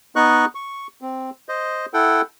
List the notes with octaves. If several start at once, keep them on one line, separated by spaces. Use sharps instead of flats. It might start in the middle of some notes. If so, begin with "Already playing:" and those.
B3 D#4 D#5 C#6 F#6
C#6
C4
C5 D#5
E4 A4 F#5 G5